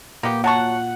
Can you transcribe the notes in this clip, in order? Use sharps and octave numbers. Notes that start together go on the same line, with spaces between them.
A#2 A#3 B3 G4
F#3 F#5 A5 C#6